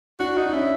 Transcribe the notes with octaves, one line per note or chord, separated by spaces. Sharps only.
D4 F#4
D#4
D4
C#4 E4